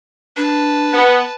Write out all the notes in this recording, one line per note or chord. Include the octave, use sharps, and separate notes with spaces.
D4 B4 A5
B3